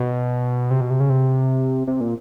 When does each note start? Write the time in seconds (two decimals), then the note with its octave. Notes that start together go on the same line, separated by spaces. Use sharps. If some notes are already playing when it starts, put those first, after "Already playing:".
Already playing: B2
0.71 C3
0.81 B2
0.90 C3
1.00 C#3
1.10 C3
1.87 C3
2.01 A#2